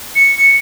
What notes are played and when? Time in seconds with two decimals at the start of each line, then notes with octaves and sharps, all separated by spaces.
0.16 C#7